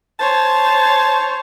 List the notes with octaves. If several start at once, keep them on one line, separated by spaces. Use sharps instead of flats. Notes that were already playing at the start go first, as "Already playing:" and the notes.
C5 C#5 A5